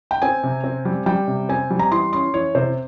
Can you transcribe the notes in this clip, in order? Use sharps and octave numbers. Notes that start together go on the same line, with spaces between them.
G5
C4 G#5
C3
C4
G3
G3 G5
C3
C4 G#5
G3
A#5
E3 C6
C#4 C6
E3 C#5
C3 C5